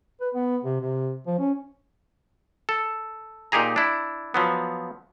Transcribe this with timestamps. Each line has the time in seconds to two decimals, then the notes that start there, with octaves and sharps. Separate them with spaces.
0.21 B4
0.34 B3
0.64 C3
0.81 C3
1.27 F3
1.39 C#4
2.69 A4
3.52 A#2 D#4 G4 G#4 A#5
3.76 D4 E4
4.34 F3 F#3 B3